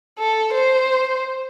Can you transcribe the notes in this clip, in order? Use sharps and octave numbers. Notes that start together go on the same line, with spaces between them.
A4
C5